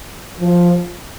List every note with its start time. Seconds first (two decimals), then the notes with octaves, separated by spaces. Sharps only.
0.40 F3